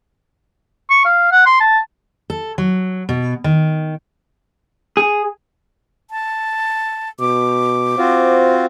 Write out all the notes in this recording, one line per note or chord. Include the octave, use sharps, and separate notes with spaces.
C#6
F5
F#5
C6
A5
A4
F#3
B2
D#3
G#4
A5
B2 D6
C4 F4 F#4 C5